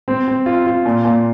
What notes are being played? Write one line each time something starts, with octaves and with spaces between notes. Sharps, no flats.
C4
C4
F4
F4
A#2
A#2